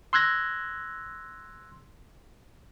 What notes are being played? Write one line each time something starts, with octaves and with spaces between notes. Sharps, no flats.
C6 E6 F#6 G#6 A#6